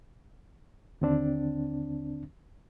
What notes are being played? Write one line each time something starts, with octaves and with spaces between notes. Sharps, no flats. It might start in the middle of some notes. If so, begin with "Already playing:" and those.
D#2 D3 C4 D4